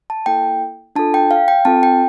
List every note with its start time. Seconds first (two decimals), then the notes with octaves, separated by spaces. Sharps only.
0.10 A5
0.26 A#3 E4 A4 G5
0.96 D4 F4 A4 A5
1.14 G5
1.31 F5
1.48 G5
1.65 C4 F4 A4 A5
1.83 G5